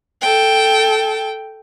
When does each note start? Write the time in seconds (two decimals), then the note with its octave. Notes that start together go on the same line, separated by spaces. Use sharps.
0.22 A4 G5